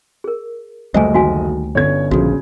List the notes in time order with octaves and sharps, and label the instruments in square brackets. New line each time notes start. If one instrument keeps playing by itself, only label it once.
[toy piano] G#4 A#4
[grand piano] F#1 D#5 [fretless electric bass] D2 G3 A3 [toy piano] C5 G#5
[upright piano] D#3 [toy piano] F#4 F5 G#5
[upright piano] G1 C#4 G#6 [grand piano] C#5
[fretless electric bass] A#1 F3 [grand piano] C#3 [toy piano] F#4